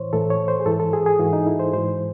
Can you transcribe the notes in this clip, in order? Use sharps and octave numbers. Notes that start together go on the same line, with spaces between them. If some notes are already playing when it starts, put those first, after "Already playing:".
Already playing: A2 E3 C5 C#5
A2 E3 A4
C#5
C5
G#4
G#2 E3 A4
A4
G#4
G#4
G#2 E3 F#4
D#4
E4
C5
G#2 E3 C5